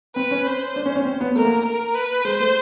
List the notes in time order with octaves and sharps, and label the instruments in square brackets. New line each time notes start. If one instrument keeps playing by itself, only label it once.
[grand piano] C4 [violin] B4
[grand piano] C#4
[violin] C5
[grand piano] D4
C#4
C#4
C4
B3
[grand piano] A3 [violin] A#4
[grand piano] A#3
[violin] A#4
B4
[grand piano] G#3 [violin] C5
[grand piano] A3